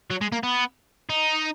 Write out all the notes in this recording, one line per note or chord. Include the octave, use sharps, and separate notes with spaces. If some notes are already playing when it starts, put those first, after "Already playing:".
F#3
G#3
A#3
B3
D#4